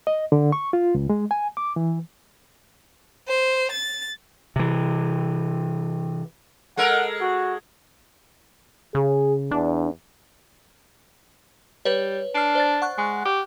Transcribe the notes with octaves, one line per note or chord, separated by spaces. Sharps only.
D#5
D3
C#6
F4
C#2
G#3
G#5
D6
E3
C5
A6
C3 E3
G#3 A4 A#4 F#5
F#4
C#3 G#4
E2 D4
G3 B4 C#5
D4 F6 C7 D7
C5 D5 A6
F#5 C#6 F#6
G#3
G4